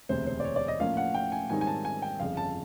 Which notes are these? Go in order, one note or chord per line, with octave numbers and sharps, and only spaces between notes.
E1 D2 C3 C5
C5
D5
C#5
D5
D#5
A2 F3 A#3 C#4 F4 F5
F#5
G5
G#5
G#2 D#3 G3 C4 D#4 G#5
G#5
A5
G#5
G5
G1 F2 C#3 F5
A5